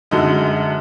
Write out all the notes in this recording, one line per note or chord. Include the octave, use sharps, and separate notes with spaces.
F#2 D3 G#3 D#4